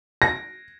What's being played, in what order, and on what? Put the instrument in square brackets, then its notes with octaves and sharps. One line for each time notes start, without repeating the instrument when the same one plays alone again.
[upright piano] A#6